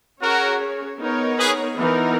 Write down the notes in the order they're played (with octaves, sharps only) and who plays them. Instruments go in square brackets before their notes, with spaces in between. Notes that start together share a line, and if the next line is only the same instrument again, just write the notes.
[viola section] C#4 G#4 C#5 [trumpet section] F#4 A#4
[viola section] B3 D#4 A#4 C#5
[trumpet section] G#4 B4
[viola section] E3 B3 D#4 A#4